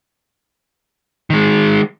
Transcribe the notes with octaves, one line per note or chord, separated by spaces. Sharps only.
D#3 G#3